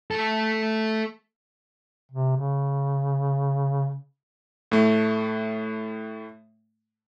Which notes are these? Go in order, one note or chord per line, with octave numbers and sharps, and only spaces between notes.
A3 A4
C3
C#3
A2 A3